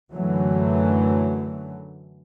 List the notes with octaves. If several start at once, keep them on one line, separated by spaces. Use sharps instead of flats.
F#2 D3 E3 F#3 A3